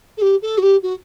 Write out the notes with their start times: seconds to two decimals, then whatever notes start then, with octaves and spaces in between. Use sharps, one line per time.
0.17 A4
0.22 G4
0.42 A4
0.58 F#4
0.63 G4
0.83 F#4